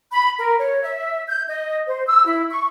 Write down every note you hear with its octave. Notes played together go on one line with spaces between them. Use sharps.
B5
A#4
C#5
E5
G6
D#5
C5
E6
E4
C#6